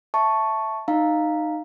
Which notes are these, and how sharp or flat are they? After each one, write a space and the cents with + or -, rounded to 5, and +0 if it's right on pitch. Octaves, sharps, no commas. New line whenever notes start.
E5 +0 A5 +0 C#6 +0
D#4 -15 F5 +0 A#5 +0